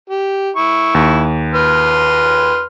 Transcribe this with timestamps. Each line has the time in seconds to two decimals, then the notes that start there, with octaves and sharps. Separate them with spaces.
0.09 G4
0.56 E4 C#6
0.95 D#2
1.55 B4 C6 F6